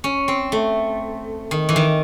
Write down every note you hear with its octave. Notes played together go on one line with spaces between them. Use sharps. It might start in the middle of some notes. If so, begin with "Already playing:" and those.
C#4
C4
A3
D#3
E3
D#3